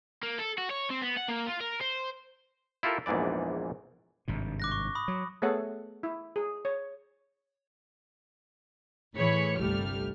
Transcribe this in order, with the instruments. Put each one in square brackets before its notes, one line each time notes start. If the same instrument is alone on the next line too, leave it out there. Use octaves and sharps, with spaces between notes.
[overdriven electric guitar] A#3
A4
F#4
C#5
C4
B3
F#5
A#3
F4
A#4
C5
[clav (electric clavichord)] E4 F4 G4 A4 A#4
A#1 E2 G#2 E3 D5
[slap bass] G#1 G2 C3
[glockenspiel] D6 F#6 A#6
C#6
B5 D#6
[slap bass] F#3
[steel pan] A3 B3 G#4 A4 C#5 F#5
E4
G#4
C#5
[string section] A2 E3 G#4 C#5 B5 C#7
G1 C2 G3 A3 F6